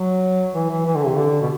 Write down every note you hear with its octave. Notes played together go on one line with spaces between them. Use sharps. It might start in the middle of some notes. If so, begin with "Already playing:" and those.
Already playing: F#3
E3
E3
E3
D3
C3
D3
B2